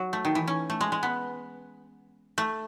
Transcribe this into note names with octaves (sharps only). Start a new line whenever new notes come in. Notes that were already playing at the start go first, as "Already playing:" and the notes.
Already playing: F#3
A3
D#3
E3
C#4
A3
G#3
G#3
B3
A3